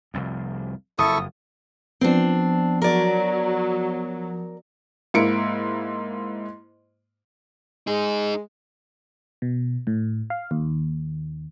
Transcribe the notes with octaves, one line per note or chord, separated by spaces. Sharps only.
F1 C2 F2
F#1 F2 E4 A4 C#6 D#6
F3 B3 C4 D4
F#3 A#4 D5
G#2 A#3 E4 C#7 D7
G#3 D#4 G#4
B2
A2
F5
D#2